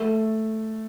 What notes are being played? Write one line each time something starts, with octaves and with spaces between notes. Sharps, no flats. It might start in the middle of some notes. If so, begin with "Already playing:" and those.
Already playing: A3